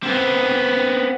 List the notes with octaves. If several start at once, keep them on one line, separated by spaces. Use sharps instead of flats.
B3 C4